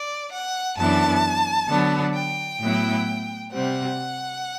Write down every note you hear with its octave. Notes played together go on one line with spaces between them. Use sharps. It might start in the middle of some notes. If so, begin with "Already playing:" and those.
Already playing: D5
F#5
F#2 E3 B3 D4 A5
D3 F#3 B3 D4
G5
A2 F#3 B3 E4
C3 G3 C4 F#5